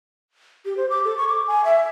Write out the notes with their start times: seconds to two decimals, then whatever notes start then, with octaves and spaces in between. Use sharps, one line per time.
0.65 G4
0.77 C5
0.90 D6
1.05 A4
1.17 C#6
1.29 D6
1.47 G#5
1.65 E5